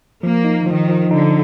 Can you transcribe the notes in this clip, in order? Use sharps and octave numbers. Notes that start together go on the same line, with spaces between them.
F3 A#3
D#4
D#3 F3
F3
D3 D#4